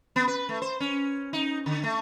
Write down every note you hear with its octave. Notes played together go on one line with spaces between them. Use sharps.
B3
B4
A3
C5
C#4
D#4
D3
A3